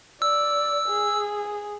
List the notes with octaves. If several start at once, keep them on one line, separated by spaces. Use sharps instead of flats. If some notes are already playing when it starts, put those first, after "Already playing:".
D5 E6
G#4